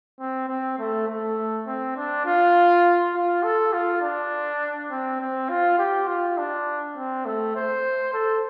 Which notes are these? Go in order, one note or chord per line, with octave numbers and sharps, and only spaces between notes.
C4
C4
A3
A3
C4
D4
F4
F4
A4
F4
D4
C4
C4
F4
G4
F4
D4
C4
A3
C5
A4